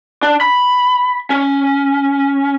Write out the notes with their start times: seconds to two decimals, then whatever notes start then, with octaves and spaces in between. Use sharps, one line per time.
0.23 D4
0.41 B5
1.30 C#4